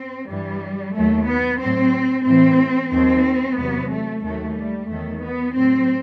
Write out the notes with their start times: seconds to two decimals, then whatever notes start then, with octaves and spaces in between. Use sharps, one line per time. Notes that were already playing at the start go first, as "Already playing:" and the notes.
Already playing: C4
0.29 G2 E3 G3
0.95 D#2 D#3 F#3 A3
1.27 B3
1.60 A2 F#3 C4
2.26 A2 E3 C4
2.91 D#2 D#3 F#3 C4
3.59 E2 C3 F#3 B3
3.91 A3
4.23 D#2 D#3 F#3 A3
4.57 G3
4.89 E2 D#3 F#3 A3
5.23 B3
5.55 A2 F#3 C4